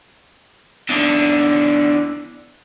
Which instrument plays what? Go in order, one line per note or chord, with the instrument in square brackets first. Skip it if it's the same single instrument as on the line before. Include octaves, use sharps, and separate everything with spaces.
[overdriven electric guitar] E2 D3